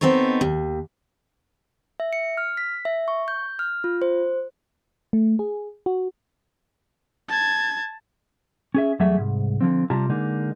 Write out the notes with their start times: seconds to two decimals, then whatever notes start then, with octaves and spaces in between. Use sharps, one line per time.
0.01 B3 C4 D#4 A4 C#5
0.41 D#2
2.00 E5
2.13 C#7
2.37 F6
2.57 B6
2.85 E5
3.08 C#6
3.28 G6
3.59 F6
3.84 F4
4.02 C5
5.13 A3
5.39 G#4
5.86 F#4
7.28 A5 G#6
8.75 C#4 G#4 E5
8.99 E2 F#3 G3 A3 G#4 E5
9.18 C2 G#2
9.61 D3 F3 C4
9.90 C3 G3 F4 G4 A5 A#5
10.09 D3 G#3 A#3 D#4